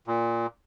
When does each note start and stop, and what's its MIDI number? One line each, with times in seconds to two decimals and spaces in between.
0.07 0.47 46